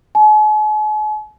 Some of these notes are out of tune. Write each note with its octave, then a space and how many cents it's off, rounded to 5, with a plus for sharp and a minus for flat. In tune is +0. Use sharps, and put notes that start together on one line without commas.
G#5 +45